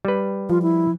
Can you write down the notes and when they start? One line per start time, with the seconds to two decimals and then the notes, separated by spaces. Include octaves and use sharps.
0.05 G3 B4
0.50 F3 F4
0.62 E4